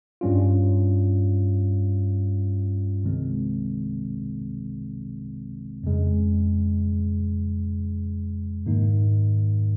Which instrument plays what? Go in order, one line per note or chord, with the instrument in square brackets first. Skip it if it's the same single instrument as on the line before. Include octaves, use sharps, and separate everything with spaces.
[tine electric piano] G2 G3 C#4 F4
C2 C3 D#3 G#3 C4
F2 C#3 G#3
G#2 D#3 A#3 D#4